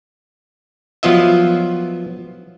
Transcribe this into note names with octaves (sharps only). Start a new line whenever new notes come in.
F3 F#3 B3 F4 D#5 E5